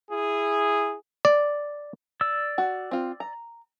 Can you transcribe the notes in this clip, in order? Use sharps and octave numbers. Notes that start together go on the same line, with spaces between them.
E4 G#4
D5
D5 E6
F#4
C4 F4
A#5